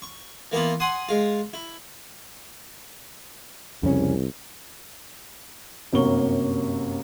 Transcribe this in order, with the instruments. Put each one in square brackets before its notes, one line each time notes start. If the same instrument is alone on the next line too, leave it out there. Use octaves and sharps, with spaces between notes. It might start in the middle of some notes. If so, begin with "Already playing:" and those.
[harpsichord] C#6
E3 A#3 B3 E4 F4
F#5 G#5 C6 D#6
G#3 F4
E4
[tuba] C2 [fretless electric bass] F2 C#3 C#4
[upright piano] G1 F#2 C3 A#3 C#6 G7